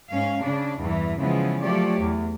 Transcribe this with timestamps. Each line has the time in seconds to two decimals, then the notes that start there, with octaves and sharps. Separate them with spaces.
0.10 G#2 C#4 F5
0.42 C#3 D4
0.79 E2 G2 E3
1.19 C#3 E3 F3 G#3 B3
1.61 F3 F#3 A3 G4 C#5 D5
2.00 E2